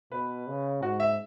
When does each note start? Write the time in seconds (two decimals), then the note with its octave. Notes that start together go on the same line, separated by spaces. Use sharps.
0.12 B2 B4
0.47 C#3
0.82 G#2 F#4
1.00 E5